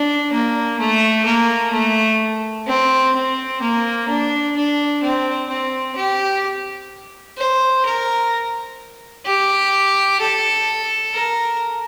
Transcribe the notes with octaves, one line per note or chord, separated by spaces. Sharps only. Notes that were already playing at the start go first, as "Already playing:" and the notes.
Already playing: D4
A#3
A3
A#3
A3
C4
C4
A#3
D4
D4
C4
C4
G4
C5
A#4
G4
A4
A#4